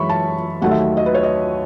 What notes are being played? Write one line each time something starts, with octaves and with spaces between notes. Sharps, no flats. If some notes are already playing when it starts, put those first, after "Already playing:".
Already playing: F#2 E3 G#3 C#5 E5 B5 C#6
A5
D#2 D#3 F#3 A3 F#5
E5
D#5
B4
C#5
D#5